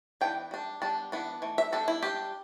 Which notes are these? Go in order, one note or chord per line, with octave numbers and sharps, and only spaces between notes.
E3 B3 D4 G5
G3 D4
G3 B3 D4 A5
E3 B3 D4
E3 A3
E5
G3 B3 D4 A4
E4
G3 D4 G4